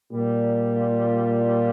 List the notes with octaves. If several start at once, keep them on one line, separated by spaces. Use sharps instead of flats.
A#2 G3
F4
F4